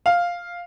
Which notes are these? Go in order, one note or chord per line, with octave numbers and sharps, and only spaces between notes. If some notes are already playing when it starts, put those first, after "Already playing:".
F5